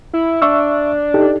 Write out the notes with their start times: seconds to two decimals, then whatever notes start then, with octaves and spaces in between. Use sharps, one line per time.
0.13 E4
0.42 D4 E5 C#6 E6
1.14 D#4 G4 A4